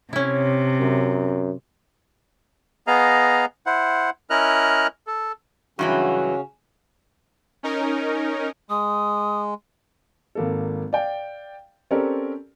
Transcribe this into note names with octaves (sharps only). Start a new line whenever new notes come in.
C3 C#4 E4
F#2
B3 G#4 D#5 F5 A#5
E4 C5 F#5
C#4 E4 A#4 D#5 F6 F#6
A4
G2 C#3 E3 F#3 C#4 F#4
C#4 D#4 A#4
G#3 D#6
G#1 A#3 A4
D5 F5 G5
C4 C#4 G4 A4 A#4 D5